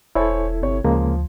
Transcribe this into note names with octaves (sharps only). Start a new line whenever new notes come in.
E1 E4 A4 C5 C#5 G#5
G1 C3 C#5
D2 C#3 F3 G#3 A#3